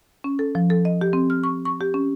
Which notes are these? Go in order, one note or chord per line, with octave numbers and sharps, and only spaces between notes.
C#4
A4
F3
A4
D#5
G4
C4
F6
C#6
C#6
G4
C#4